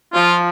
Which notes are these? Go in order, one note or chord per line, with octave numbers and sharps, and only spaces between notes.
F3 F4